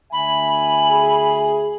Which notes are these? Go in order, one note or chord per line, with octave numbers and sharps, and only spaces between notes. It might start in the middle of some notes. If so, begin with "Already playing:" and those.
D2 E5 G#5 B5
G#4